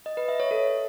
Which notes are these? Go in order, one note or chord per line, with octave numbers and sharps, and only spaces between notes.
D#5
B4
E5
C#5
A4